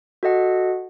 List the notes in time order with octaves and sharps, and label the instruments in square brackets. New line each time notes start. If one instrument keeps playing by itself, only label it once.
[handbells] F#4 A4 D#5 F#5